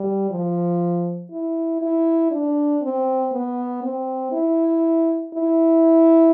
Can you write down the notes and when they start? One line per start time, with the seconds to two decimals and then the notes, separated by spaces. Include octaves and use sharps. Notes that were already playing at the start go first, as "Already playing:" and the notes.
Already playing: G3
0.30 F3
1.31 E4
1.81 E4
2.31 D4
2.82 C4
3.33 B3
3.83 C4
4.32 E4
5.34 E4